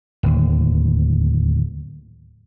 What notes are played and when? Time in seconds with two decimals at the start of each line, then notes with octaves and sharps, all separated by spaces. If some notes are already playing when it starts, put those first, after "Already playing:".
0.23 D1 D#2